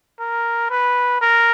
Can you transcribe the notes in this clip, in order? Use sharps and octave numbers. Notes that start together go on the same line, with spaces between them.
A#4
B4
A#4